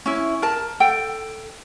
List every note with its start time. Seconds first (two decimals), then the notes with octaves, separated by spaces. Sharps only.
0.06 C#4 E4
0.42 A#4 A5
0.80 A4 G5